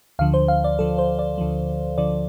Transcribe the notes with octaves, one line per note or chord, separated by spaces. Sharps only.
D2 D3 F3 F5
C5
F5
D5
D2 D3 F3 A4
C5
D5
D2 D3 F3
D2 D3 F3 D5